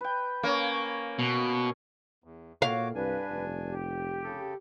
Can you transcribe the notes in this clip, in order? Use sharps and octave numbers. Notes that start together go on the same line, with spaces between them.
B4 G5
A#3 C#4 C#5
B2
E2
A#2 F#4 C#5 F5 D6
C2 G2 D4 B4 G#5
F1
G4
C#3 A4